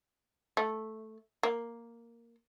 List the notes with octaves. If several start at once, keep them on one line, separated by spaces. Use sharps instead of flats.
A3
A#3